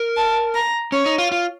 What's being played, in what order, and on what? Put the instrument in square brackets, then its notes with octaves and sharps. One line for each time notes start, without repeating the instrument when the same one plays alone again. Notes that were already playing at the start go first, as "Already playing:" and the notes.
Already playing: [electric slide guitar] A#4
[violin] A5
A#5
[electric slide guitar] C#4 [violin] C#5
[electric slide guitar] D#4
F4
F4